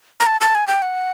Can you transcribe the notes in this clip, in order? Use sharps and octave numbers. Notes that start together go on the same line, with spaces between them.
A#5
A5
A5
G#5
G5
F#5